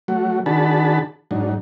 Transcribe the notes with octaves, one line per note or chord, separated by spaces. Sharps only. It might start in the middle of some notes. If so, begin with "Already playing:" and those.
F#3 A3 F#4
D#3 D4 F#4 G#4 A5 B5
G#2 F#3 D4 D#4